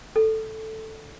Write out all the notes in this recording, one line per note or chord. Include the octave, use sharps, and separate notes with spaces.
A4